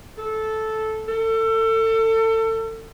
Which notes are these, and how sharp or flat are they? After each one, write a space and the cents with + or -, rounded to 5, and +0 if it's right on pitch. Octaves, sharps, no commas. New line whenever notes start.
A4 -10
A4 +30